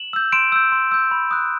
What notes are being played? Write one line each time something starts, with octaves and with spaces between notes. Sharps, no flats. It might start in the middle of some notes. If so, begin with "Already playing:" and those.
Already playing: E7 F#7
E6 G6
C6 D7 E7
E6 G6
C6
E6 G6
B5
D#6 F#6